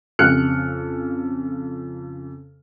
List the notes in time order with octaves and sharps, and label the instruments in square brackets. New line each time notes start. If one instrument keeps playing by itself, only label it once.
[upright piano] F2 C#3 F6 F#6 C#7